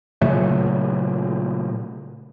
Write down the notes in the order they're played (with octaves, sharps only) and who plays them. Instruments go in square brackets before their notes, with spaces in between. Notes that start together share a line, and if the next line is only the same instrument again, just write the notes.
[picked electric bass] A#2 C#3 F#3 A3